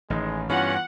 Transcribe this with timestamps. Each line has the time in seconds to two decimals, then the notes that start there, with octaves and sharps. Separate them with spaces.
0.10 A1 D#3 G#3
0.50 G2 E3 B3 C#4 F4 F#5